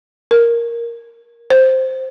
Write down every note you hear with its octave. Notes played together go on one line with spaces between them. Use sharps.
A#4
C5